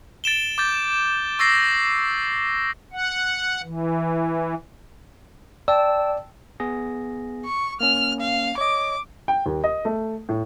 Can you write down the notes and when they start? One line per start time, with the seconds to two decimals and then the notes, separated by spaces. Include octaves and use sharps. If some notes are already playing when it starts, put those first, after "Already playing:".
0.24 A6 D7 E7 G7
0.58 D6 G6 A6
1.39 C#6 E6 A6 A#6 C7
2.92 F#5
3.63 E3
5.68 D5 G5 A5 E6
6.60 B3 G#4 A#6
7.45 C#6
7.81 A#3 C#4 F6
8.20 F5
8.58 C#5 D#5 D6
9.28 G5
9.46 D#2
9.64 D#5
9.85 A3
10.29 A2